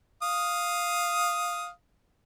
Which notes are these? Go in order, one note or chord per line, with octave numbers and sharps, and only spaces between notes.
F5 D#6